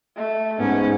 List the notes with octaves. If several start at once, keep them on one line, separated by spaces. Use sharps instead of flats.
A3
G#2 B3 C#4